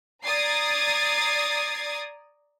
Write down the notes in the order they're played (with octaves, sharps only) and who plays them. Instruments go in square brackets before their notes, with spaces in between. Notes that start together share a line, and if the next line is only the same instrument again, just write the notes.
[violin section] D5 A#5 D#6 G#6 A6 C7